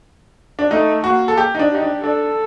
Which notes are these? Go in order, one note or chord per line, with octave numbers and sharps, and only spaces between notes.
D4
A3 D#4
A#3 F#4
A4
G4
D#4
D4
D#4 G4
D4
D4 A4